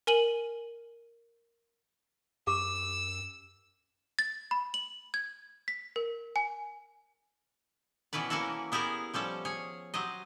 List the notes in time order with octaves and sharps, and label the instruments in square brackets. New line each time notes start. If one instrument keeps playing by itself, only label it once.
[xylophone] A#4 G#5 D#7 F#7
[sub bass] F#2 [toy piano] G4 D6 [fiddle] E6
[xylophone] A6
B5
F#7
G#6
B6
A#4
G#5
[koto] B2 E3 C#4 B4 D5
E3 A#3 C#4 E4 F#4 A4
B3 E4 G4 G#4 A#4
F3 G3 C#4 A4
G#4 C#5 G#5
F#3 G4 C5 D#5